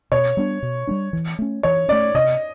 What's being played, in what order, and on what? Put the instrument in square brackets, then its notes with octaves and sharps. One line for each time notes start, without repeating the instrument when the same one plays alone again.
[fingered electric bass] B2 [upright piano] C#5
[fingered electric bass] G3 B3 D4
B2
G3 B3 D4
E3
A3 C#4
[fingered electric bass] E3 [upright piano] C#5
[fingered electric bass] C#4 [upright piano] D5
[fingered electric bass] A3
[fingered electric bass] C3 [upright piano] D#5